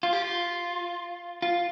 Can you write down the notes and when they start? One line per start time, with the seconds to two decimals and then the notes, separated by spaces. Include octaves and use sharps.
0.03 F4
0.13 G4
0.22 F4
1.42 F4